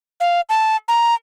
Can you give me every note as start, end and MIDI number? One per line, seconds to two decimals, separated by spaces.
0.20 0.41 77
0.49 0.76 81
0.88 1.14 82